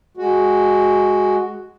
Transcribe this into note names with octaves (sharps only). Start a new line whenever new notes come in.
G#3 F#4